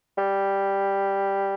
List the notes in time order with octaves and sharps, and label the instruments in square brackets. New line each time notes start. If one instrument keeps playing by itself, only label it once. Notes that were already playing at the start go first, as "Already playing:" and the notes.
[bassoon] G3